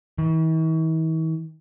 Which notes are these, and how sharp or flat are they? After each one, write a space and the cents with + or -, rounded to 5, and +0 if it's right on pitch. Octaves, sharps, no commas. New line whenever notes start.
E3 -45